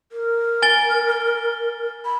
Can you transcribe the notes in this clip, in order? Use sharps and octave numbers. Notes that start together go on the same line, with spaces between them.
A#4
G#5 A6 G7
B5